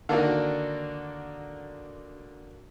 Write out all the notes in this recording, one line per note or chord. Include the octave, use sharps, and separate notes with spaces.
D3 D#3 A#3 D4 F#4